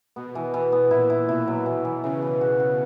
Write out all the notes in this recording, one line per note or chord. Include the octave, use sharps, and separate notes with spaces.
B2 B3
E3
B2 E3
B3
A#2 E4
E4
B2 E4
F#3
E3
E3
C#3 E3
E3
F#4
F#4